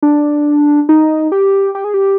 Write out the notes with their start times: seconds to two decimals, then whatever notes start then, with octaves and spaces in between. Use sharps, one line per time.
0.02 D4
0.89 D#4
1.32 G4
1.75 G4
1.84 G#4
1.94 G4